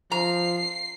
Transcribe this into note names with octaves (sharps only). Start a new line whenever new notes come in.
F3 A#5 C7